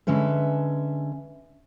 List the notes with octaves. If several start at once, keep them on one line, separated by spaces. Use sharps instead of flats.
D3 G#3 C#4 B4 E5